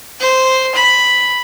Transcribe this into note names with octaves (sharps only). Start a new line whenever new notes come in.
C5
B5